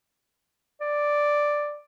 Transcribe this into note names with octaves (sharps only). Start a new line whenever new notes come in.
D5